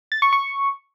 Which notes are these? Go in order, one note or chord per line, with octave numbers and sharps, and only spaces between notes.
A6
C#6
C#6